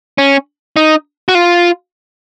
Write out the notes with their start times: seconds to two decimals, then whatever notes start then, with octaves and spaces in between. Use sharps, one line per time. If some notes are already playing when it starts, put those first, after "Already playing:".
0.18 C#4
0.76 D#4
1.29 F#4
1.35 F4